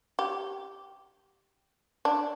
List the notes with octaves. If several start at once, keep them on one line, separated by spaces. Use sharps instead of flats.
G4
D4